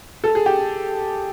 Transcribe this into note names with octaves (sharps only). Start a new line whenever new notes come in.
A4
G#4
G4